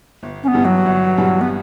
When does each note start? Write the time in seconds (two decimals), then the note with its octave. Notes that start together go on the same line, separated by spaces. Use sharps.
0.23 G1
0.43 C#4
0.48 B3
0.54 G2 E3 G3
0.65 F#3
0.86 G1
1.17 G2 E3 G3
1.41 B3